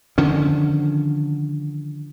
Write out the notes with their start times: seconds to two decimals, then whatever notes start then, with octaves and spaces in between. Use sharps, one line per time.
0.18 D3 D#3 F3 C#4